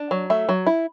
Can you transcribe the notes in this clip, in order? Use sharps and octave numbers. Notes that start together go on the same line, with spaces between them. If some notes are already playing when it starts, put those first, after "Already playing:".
Already playing: D4
F#3
A3 E5
F#3
E4